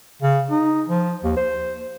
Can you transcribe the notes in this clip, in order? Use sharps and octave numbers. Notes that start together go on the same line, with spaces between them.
C#3
D#4
F3
D#2
C5